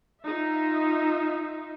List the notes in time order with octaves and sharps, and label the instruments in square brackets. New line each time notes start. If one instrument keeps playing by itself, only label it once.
[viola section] D#4 F4 E5